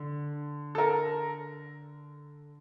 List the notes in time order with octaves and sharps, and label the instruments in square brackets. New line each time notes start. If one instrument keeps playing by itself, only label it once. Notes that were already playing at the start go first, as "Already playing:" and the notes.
Already playing: [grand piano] D3
[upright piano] A4
A#4